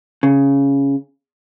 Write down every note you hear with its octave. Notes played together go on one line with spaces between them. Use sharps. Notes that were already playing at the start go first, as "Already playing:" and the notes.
C#3